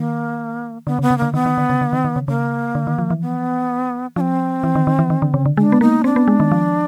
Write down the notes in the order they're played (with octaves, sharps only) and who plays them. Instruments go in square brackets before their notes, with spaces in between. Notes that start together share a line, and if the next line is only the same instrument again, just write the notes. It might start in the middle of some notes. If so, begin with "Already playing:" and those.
Already playing: [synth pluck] D#3 [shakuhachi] A#3
[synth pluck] D3 [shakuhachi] B3
[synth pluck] C#3
[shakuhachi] B3
[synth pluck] C#3
[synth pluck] D3 [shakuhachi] A#3
[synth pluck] D#3 [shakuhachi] B3
[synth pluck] D#3
D3
C#3
D3
D#3
D#3
C#3
[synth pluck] C#3 [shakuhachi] A#3
[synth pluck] D3
D#3
F3
E3
[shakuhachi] B3
[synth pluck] F3 [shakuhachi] C4 D4
[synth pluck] E3
D#3
D#3
E3
D#3
D3
C#3
D3
[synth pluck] G#3 [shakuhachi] D4
[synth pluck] B3
[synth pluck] A#3 [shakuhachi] D#4
[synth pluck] C4 [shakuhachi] D4
[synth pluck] B3
G#3
D#3
F3